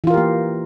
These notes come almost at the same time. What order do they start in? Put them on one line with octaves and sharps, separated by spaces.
E3 F4 A#4 G4 A#3